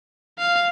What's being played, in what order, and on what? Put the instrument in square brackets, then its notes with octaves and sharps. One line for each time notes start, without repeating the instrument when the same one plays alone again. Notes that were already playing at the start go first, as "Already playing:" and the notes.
[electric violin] F5